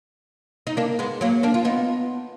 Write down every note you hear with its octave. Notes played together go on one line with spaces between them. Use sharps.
D#4
A#3 D4
G#3 B3
F#3 A#3
A#3 D4
F4
B3 D#4